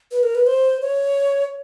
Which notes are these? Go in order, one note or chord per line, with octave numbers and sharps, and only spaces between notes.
B4
A#4
B4
C5
C#5